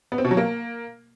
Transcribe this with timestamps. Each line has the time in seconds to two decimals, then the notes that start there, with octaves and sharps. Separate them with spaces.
0.12 B3
0.18 C4
0.24 B2
0.31 F#3
0.37 A#3